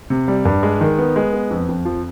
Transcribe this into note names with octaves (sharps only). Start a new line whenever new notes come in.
C3
G3
G2
G#3
D#3
B3
G#3
B3
F2
F2
F3